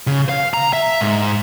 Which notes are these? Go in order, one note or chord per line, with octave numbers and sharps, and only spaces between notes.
C#3
F5
A#5
E5
G#2